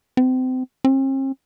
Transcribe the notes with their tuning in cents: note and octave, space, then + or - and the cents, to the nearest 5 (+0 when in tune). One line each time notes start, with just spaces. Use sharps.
C4 -30
C4 +45